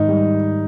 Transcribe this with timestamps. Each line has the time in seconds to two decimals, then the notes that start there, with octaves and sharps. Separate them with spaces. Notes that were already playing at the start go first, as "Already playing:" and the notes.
Already playing: G#2 D#3 D#4
0.08 G3